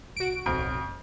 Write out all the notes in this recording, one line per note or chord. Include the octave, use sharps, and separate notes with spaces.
C2 F#4 D7
D1 B1 F2
F#1